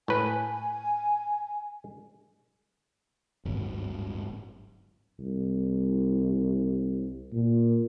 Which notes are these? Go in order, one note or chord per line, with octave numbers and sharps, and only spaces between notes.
A2 B4 G#5
D1 G1 G#2 F#3
C2
A#2